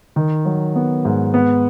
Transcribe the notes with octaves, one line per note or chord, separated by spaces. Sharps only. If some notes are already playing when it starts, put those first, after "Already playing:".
D#3
F#3
B3
G#2
B3